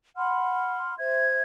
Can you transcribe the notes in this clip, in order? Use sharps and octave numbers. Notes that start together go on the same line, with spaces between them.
F#5 B5 C6 F6
C5 E5 G#6